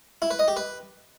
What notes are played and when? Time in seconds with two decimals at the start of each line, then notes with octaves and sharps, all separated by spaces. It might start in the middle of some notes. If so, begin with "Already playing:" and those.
0.22 E4
0.31 B4
0.39 D#5
0.48 G4
0.57 B4